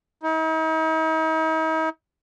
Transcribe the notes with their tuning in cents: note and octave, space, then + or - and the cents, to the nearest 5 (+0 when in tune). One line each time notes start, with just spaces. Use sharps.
D#4 +45